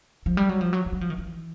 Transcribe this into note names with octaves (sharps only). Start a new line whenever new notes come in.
F3
G3
F#3
F3
F#3
F#3
G3
F3
D#3
E3